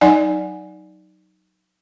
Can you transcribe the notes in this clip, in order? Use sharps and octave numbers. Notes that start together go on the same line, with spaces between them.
F#3 D#4 D5 F#5 G#5